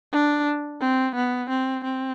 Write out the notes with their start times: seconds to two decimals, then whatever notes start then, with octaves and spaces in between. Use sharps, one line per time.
0.13 D4
0.81 C4
1.15 B3
1.50 C4
1.84 C4